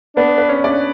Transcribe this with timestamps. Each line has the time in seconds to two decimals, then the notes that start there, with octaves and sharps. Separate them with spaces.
0.16 B3 D4 B4
0.38 B4
0.49 C#4 C#5
0.64 D4 D5